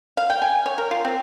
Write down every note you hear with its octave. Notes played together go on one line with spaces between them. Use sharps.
F5
G5
G#5
C#5
A#4
F4
C4